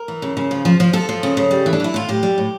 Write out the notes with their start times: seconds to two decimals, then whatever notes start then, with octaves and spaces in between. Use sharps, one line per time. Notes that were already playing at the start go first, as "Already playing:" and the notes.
Already playing: A#4
0.08 E3
0.22 C#3
0.37 C#3
0.51 F3
0.65 F3
0.80 F3
0.93 F3 A4
1.09 F3
1.23 C#3
1.37 C#3
1.51 G3
1.66 E3
1.73 D4
1.80 E3 E4
1.94 A2 F4
2.09 A2 G4
2.23 G3
2.38 A2